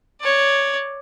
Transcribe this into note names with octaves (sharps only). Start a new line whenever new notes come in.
C#5 D5